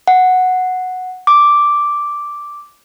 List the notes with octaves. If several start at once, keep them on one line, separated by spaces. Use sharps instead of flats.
F#5
D6